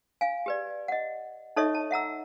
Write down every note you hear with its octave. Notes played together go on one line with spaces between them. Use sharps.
F5 G#5
G4 B4 D5
D#5 F#5
D#4 A4 C#5 D#5 E5 C#6
A5
E5 F#5 A#5 E6